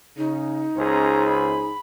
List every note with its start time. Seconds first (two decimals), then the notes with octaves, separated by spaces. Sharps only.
0.17 C#3 D#4
0.78 C#2 C#4 G#4 C5 A#5
1.29 B5